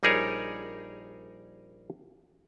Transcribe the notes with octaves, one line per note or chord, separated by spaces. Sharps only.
A#1 G3 D#4 G#4 A#4 C#5